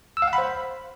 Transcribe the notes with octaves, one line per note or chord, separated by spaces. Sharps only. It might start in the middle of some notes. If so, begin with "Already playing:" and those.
E6
F5
F#5
B5
C5